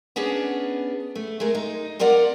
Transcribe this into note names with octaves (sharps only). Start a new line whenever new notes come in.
B3 C#4 D4 G#4
A3
G#3 A3 A#4
D#4
F2 F4 A#4 D5 F#5